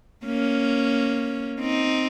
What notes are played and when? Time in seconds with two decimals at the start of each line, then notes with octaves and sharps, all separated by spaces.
0.25 A#3 C#4
1.60 C4 D#4